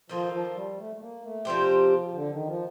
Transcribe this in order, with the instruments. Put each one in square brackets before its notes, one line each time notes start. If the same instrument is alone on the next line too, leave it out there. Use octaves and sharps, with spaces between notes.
[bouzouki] D#3 A#3 F4 A4 [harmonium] F3
[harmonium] F3
G3
A3
A3
A#3
A3
[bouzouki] C3 G3 C4 G4 [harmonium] F3
[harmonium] D3
D#3
F3